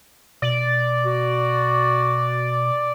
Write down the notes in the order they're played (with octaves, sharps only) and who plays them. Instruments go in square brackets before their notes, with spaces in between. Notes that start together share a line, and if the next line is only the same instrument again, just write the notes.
[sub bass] B2 [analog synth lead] D5
[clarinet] F#4